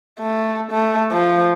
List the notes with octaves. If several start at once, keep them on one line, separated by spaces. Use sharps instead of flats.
A3
A3
F3